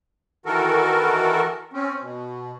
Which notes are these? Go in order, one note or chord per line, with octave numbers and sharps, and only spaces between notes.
D#3 E3 F#4 A4 A#4
C4 C#4
B2